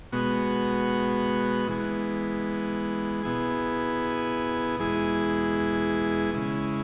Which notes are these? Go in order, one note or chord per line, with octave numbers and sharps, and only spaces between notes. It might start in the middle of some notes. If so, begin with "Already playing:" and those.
B2 G#3 B3 F#4
E3 G#3 B3
B2 B3 E4 G#4
E2 B2 G#3 E4 G#4
C#3 G#3 E4